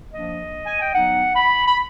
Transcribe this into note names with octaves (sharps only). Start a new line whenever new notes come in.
F3 A#3 D4 D#5
G#5
G5
F#3 B3 D#4 F#5
B5
B5